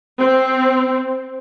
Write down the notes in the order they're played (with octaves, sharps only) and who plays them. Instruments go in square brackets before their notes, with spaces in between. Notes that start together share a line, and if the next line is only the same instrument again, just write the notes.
[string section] C4